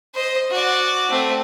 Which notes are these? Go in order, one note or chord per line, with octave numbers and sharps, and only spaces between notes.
C5 D#5
F#4 D5
A3 C4